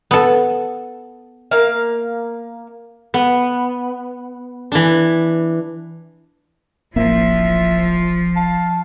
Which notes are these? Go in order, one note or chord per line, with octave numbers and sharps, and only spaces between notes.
B3 A4
A#3 F5
B3
E3 D4
D1 A1 F3 A#3 E5
F5 A5